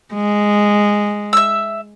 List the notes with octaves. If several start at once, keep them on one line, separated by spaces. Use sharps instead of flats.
G#3
E5 E6